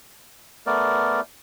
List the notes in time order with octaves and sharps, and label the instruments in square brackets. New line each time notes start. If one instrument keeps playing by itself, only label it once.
[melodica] A3 B3 A#4 D5